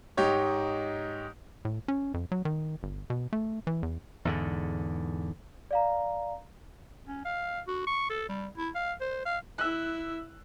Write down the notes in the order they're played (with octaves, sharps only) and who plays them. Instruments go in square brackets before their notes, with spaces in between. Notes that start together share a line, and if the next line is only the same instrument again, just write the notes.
[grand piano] G#2 D#4 G4 C#5
[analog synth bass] A2
C#4
F2
F#3
D#3
G1
B2
A3
E3
E2
[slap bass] E2 G#2 D3
[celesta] D5 F5 A#5
[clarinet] C#4
F5
F#4
C#6
A4
G3
E4
F5
C5
F5
[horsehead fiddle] E4 E5 [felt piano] E6 F#6